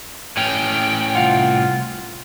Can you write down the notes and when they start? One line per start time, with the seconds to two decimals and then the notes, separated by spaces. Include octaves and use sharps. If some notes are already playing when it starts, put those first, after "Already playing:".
0.37 A2 C#4 G5
1.15 C2 F4 F5 F#5